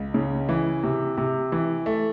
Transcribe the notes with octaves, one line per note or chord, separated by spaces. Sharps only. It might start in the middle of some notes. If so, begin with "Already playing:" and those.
Already playing: C#2
C#3
E3
C3
C3
E3
A3